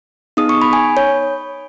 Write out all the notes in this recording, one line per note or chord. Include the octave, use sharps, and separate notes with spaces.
B3 D#4 G#4 D#6
C#6
B5
G#5
C#5